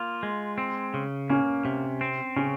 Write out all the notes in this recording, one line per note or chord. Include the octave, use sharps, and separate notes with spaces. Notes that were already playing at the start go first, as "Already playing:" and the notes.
Already playing: A#3 F4
G#3
C4
C#3
A#3 C#4
C3
C4
C#3 C#4